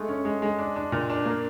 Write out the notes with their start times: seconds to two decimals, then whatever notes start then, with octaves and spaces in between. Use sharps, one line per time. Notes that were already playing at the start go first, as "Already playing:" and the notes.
Already playing: G#3 A3
0.09 C#4
0.25 G#3
0.42 G#3
0.58 D4
0.76 D4
0.92 A#2
1.09 D4
1.25 A#3